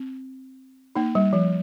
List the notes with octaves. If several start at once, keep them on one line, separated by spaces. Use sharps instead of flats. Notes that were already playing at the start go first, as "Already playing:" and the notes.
Already playing: C4
A#3 D#4
G3
F3